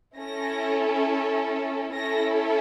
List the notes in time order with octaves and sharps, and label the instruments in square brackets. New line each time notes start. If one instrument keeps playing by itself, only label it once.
[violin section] C#4 E4 A4 A#6
C#4 E4 A4 A#6